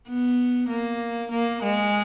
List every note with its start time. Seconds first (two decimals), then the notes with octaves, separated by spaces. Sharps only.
0.08 B3
0.69 A#3
1.31 A#3
1.63 G#3